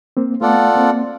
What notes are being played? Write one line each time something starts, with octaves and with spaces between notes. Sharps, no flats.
A#3 C4
A3 B3 F4 A4 D5 F#5
A#3 C4